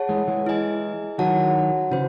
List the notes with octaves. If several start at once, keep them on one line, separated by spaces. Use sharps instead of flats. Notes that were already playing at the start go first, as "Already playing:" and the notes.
Already playing: G#4 C#5 F#5 A5
E3 G#3
E3 G#3
E4 G#4 D#5 G#5
D#3 F#3 F#4 C#5 F#5 A5
C#3 E3 F#4 C5